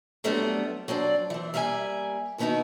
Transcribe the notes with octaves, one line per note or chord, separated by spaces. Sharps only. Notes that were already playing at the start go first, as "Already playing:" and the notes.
F#3 G3 A3 B3 C4 D4
F#3 C4 D4 D5
E3 C4
G3 A#3 E5 F#5 G#5
B2 D#3 B3 D#4 E4 F#4